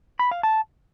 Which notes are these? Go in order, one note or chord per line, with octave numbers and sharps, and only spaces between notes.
B5
F5
A5